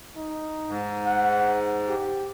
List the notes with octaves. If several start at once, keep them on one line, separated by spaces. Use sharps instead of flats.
D#4
G#2
F#5
G4